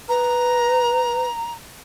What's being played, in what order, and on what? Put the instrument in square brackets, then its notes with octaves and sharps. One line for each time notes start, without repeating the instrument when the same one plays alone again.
[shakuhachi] B4 [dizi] A#5